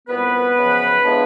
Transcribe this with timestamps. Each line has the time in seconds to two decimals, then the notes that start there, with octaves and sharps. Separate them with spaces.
0.07 C2 A#2 G3 B3 B4
0.56 F#2 C#3 F3
1.04 A2 F3 G#3 B3 D4